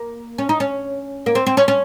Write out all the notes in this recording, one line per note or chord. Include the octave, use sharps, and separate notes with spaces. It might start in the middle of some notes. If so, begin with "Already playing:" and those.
Already playing: A#3
C#4
D#4
C#4
A#3
C4
C4
C#4
C#4